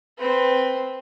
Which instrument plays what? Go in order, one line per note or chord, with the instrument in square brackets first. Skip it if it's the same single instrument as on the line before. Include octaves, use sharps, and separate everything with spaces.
[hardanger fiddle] C4 B4